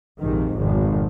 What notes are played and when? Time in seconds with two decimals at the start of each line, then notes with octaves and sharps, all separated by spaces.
0.20 A#1 F2 G#2 C3 D#3
0.58 G#1 F2 B2 D#3